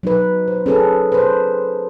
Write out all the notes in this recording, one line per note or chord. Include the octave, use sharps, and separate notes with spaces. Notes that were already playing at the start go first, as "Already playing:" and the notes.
F#3 D#4 B4
C5
C#4 G#4 A4 B4
B4 C5